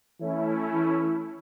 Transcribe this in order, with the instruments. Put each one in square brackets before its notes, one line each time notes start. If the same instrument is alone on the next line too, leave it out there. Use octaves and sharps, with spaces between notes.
[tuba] E3 [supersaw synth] A3 C#4 E4
[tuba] E3